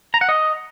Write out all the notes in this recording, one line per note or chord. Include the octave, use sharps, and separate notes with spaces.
A#5
F#5
D#5